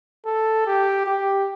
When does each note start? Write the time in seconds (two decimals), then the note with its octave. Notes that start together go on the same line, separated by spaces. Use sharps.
0.26 A4
0.67 G4
1.06 G4